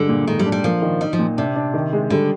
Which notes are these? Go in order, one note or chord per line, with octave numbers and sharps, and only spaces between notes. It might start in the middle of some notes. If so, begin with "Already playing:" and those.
Already playing: G2 D3 G#3
A#2
G#2 D#3
G3
D4
G3
F3 A#3
D#3
G3 D#4
F3
A#2
C3 D4
D4
D#3
G#3
D3 G3